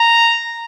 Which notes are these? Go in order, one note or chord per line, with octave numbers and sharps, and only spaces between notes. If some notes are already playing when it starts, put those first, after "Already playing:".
Already playing: A#5